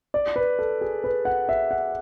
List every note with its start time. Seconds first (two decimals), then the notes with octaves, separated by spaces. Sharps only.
0.14 D5
0.36 B4
0.59 A4
0.81 G#4
1.04 B4
1.25 F#5
1.49 E5
1.71 F#5